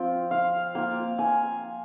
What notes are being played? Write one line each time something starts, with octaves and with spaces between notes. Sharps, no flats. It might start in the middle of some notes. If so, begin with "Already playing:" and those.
Already playing: F3 C4 F4 G5
F5
A#3 F4 G5
G#5